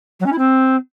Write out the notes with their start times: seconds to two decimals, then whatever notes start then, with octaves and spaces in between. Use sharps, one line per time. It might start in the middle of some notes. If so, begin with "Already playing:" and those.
0.20 F#3
0.26 C#4
0.32 E4
0.38 C4